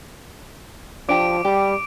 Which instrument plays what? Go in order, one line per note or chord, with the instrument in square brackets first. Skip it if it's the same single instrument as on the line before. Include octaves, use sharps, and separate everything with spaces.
[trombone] F3 [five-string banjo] D4 G4 [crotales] D6 D7
[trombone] G3 [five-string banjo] G4